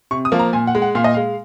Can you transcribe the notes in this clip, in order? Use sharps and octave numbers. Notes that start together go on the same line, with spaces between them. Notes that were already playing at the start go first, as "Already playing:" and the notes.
C3 C#6
D#6
F3 A#3
A#5
A#2 G#5
F#5
G#3
F#5
A#2 F5
D#5
G#3 F5